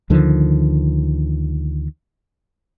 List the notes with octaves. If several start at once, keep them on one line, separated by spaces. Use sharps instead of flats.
D2 D3 D#3 F3